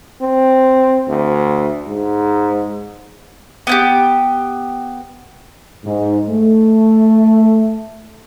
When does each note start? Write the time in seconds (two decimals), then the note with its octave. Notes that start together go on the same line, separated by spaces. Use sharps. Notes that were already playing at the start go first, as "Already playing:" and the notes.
0.21 C4
1.08 D2
1.88 G#2
3.67 B3 E4 G4
5.85 G#2
6.30 A3